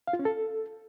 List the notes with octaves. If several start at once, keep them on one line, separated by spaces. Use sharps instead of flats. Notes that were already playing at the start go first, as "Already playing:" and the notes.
F5
F4
C#4
A4